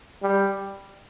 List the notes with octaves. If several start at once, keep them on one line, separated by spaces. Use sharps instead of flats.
G3